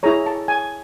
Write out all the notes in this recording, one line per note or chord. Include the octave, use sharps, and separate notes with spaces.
E4 G#4 C#5 A#5
A5
G#5